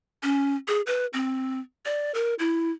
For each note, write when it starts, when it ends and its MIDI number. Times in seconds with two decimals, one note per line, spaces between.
0.23 0.55 61
0.68 0.81 68
0.87 1.06 71
1.13 1.60 60
1.86 2.12 74
2.14 2.34 70
2.39 2.71 64